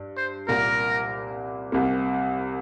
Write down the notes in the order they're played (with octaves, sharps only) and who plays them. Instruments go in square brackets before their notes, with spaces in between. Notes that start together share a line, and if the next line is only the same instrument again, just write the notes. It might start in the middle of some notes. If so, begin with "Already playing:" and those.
Already playing: [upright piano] G2
[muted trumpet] C5
[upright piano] C2 A#2 A#3 [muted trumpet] A#4
[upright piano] C2 C3 A#3